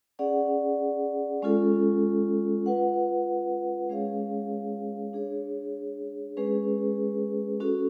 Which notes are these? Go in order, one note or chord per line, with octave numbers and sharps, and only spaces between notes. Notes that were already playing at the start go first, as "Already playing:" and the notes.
C#4 G#4 D5 F#5
G#3 C#4 F4 A4
F4 B4 F#5
G#3 C#4 G#4 C#5 F5
D4 G#4 C#5
G#3 C#4 G#4 B4
C#4 F#4 A4